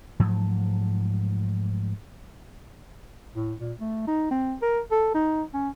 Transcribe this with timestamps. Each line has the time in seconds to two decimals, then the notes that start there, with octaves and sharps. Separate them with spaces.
0.20 G#2 F3 F#3 A3
3.36 A2
3.60 A#2
3.81 A3
4.07 D#4
4.31 C4
4.62 A#4
4.92 A4
5.15 D#4
5.54 C#4